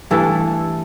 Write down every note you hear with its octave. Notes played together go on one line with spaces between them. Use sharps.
G2 E3 A3 A4